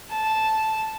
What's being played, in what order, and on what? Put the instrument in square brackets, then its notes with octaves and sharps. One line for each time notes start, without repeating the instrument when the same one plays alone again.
[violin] A5